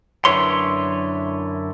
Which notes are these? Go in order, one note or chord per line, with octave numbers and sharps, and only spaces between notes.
F#2 D3 E4 B4 C#5 C6